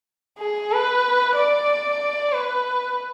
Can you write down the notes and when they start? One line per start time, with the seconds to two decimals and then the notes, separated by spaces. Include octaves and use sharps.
0.39 G#4
0.72 B4
1.36 D5
2.32 B4